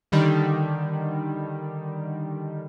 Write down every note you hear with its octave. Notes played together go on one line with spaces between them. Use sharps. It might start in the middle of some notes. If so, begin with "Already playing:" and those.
D3 D#3 G3